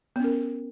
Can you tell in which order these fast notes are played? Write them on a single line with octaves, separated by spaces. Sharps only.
B3 C#4 A#4